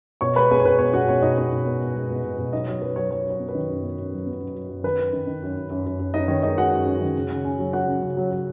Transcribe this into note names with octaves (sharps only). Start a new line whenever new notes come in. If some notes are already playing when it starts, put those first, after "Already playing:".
B2 C#5 C#6
G#3 B4 B5
B3 G#4 G#5
C#5
B2 B4
B2 C#5
G#3 F#4 F#5
B2 C#5
B2 D#4 D#5
B3 C#5
B2
B3
B3
G#3
B2
B2
B2
F#3 D#4 D#5
F#3 C#5
F#3 B4
F#3 C#5
F#3 C#5
F#3 C#5
B3
B4
D#3
F#2
B3
F#2
F#3
B3
F#3
F#3
F#2
D#3 B4
F#2
D#3
D#3
F#2
F#2
F#2
F#2
F#2
F#2 D#4 D#5
D#3 C#5
G#3 D#4 D#5
G#3 F#4 F#5
F#2
F#2
D#3
C#3
C#3
C#4
F#3
F#3 F#4 F#5
C#3
C#3
F#3
F#3